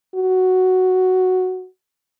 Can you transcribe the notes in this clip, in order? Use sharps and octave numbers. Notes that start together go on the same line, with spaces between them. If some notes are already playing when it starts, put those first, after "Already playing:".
F#4